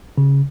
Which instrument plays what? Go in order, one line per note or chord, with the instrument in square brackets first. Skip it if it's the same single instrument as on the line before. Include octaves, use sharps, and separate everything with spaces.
[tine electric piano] C#3